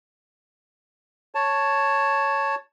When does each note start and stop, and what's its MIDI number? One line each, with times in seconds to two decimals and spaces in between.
1.35 2.55 73
1.35 2.55 81